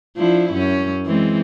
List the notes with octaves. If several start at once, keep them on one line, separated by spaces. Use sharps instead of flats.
F3 D4 E4
F#2 C#4
E3 G#3 C4